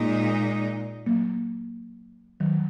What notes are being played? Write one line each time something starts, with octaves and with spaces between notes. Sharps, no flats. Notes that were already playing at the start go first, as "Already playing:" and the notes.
Already playing: A#2 G#3 A#3 D#4
F#3 A#3
D#3 F#3